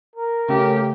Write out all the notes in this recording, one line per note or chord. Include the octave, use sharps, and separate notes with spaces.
A#4
C#3 A3 G4